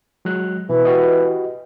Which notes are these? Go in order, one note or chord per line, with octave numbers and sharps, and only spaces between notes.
F#3 G#3 F#6
B2 E3
F#4 G4 D#5